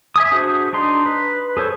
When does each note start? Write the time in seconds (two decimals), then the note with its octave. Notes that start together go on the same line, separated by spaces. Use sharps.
0.16 E5 G#5 D#6
0.32 D4 F#4 G#4 C5
0.73 D4 D#4 C6
1.06 B4
1.57 G#4 A4 C5 C#5